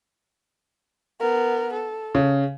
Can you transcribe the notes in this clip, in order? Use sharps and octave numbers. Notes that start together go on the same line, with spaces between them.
B3 A#4
A4
C#3